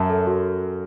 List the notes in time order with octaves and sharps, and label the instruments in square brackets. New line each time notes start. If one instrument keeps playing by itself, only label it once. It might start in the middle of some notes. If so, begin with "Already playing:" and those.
Already playing: [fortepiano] F#2 [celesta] E5 A5
[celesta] A4
F#4